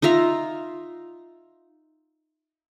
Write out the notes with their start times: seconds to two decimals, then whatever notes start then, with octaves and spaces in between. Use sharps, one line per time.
0.02 D#4 F4 E5 A#5